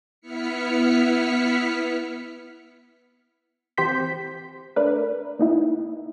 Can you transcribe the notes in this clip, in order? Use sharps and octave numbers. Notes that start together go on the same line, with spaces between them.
B3 E4 F6 B6 C#7
E3 C4 G4 C5 G6 B6
A3 D4 A#4 B4
A#3 D#4 E4